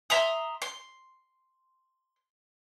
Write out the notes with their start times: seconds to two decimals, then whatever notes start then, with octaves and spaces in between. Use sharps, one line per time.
0.10 E5 A#5 C6 D#6
0.62 C6